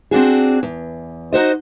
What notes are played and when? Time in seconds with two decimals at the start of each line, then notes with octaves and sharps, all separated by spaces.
0.11 C4 D4 F#4 G#4
0.63 E2
1.33 D#4 F#4 C5 D#5